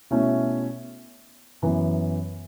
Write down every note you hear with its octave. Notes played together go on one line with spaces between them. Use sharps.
B2 A3 C#4 E4
F#2 E3 B3 E4